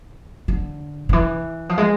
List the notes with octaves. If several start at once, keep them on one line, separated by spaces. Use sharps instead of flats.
D3
D3
E3
F3
G#3